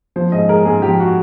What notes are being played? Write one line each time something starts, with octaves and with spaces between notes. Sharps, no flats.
F3 C5
G#2 D#5
G#3 A#4
G#2 G#4
F3 G4
F#4